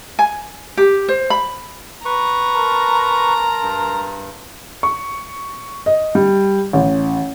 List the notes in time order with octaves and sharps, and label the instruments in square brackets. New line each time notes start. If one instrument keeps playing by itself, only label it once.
[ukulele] G#5
G4
C5
B5
[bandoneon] B4 C#6 [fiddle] A#5
[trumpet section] A#4 A5 C6
[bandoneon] G2
[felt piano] C#6
D#5
G3
A1